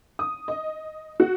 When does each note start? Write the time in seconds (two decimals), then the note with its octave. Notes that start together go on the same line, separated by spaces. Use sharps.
0.19 D#6
0.48 D#5
1.20 F#4